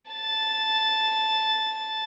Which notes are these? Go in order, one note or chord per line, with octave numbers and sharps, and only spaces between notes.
A5 A6